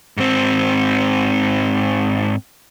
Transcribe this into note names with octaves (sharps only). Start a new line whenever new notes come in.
G#2 C4